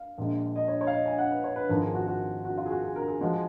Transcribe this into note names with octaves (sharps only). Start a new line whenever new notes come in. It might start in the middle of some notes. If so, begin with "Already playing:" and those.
Already playing: F5
A#1 A#2 G#3
D#5
C#5
D#5
C#5
F5
D#5
G#5
F#5
B4
C#5
B4
G#1 G#2 F3 A#4
G#4
F#4
F#4
F#4
F4
G#4
F#4
G#4
A#4
G#4
F3 G#3 F#4
G#4